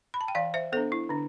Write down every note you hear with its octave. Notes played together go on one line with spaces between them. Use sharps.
B5
A5
G5
E3 D5 F5
C5 E5
B3 D4 A4 C5
E4
D3 D4